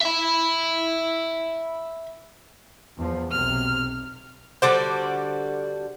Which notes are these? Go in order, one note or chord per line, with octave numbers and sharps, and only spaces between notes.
E5 B5
E2 F3
B1 C3 F6
D3 G3 F#4 C5 D6